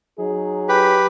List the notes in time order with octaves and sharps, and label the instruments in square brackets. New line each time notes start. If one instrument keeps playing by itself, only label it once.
[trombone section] F#3 D#4 G#4
[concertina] G4 B4